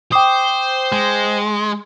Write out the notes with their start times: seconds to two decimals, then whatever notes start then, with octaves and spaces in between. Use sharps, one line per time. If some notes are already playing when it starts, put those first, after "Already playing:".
0.12 C5 G5 D6 D#6
0.92 G#3